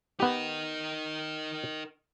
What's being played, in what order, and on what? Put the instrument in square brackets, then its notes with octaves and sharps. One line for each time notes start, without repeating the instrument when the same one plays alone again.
[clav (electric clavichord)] B3 G4 [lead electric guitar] D#4 A#4